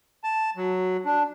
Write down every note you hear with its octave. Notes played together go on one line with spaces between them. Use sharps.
A5
F#3
D4